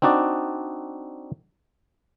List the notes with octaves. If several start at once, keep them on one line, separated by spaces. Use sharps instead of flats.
C4 D4 D#4 F#4 D5